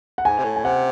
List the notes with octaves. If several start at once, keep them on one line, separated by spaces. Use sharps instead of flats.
F#5
G#2 G#5
C3
A2
G#5
C3 F#5